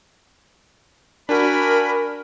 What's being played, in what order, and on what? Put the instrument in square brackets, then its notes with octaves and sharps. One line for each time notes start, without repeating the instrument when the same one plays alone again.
[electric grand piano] D4 F#4 [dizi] A#4 [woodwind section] G#5 B5